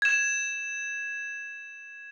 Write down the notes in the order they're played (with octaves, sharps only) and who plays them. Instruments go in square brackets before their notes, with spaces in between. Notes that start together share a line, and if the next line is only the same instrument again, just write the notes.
[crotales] G#6 E7